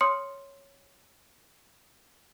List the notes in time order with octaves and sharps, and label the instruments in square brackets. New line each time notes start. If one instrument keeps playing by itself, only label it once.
[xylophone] C#5 C6 D#6 F6 C#7